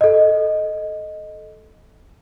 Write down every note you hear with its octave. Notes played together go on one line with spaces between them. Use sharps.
A4 D#5